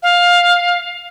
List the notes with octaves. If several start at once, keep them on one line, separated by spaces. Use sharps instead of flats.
F5